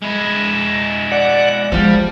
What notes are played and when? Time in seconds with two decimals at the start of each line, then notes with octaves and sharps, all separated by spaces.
0.02 G#3 E4
1.11 D5 F#5
1.72 F3 G3 G#3 B3